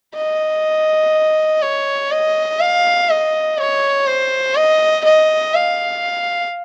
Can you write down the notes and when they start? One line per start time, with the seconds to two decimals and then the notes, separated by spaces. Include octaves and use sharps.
0.15 D#5
1.62 C#5
2.11 D#5
2.60 F5
3.10 D#5
3.58 C#5
4.07 C5
4.56 D#5
5.05 D#5
5.54 F5